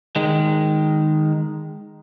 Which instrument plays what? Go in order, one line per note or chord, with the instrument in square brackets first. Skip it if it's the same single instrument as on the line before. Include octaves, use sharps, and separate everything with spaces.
[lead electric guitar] D#3 G#3